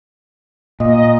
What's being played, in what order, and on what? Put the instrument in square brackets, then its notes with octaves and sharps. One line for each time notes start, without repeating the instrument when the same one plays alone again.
[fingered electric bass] A#2 [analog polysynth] D#5